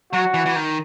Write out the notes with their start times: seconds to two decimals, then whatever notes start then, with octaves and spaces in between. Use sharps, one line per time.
0.13 F#3 F#4
0.34 E3
0.46 E3
0.56 D#3